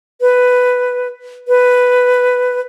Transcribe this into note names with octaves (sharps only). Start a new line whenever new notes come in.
B4
B4